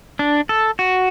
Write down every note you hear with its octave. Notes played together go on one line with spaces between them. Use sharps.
D4
A4
F#4